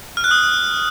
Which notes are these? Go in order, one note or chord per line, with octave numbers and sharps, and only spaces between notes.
F6
F#6
D#6